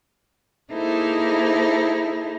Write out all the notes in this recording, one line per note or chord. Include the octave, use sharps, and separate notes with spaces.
A#3 D#4 E4 G#4 A4 C5